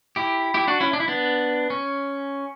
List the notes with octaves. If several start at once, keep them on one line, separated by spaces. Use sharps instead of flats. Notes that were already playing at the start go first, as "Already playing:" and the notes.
E4 G4
E4 G4
D4 F#4
C#4 E4
D4
E4
B3 D4
C#4